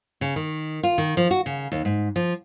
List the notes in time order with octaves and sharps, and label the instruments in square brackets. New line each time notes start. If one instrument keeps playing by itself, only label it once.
[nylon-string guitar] C#3
D#3
F4
D#3
F3
F#4
C#3
D#2
G#2
F3